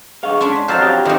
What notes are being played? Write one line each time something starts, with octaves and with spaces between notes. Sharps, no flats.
B1 D3 G#4 D#5 F5 C#6
G#2 C#4 D4 C6
B6
F2 F#3 C5 A5 A#5 F6
G4 F5 D#6
F2 C3 D#3 C4 D#4